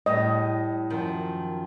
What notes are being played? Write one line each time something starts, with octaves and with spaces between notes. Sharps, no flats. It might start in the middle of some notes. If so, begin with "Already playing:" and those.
A2 G3 D#5
F#2 D#3 F3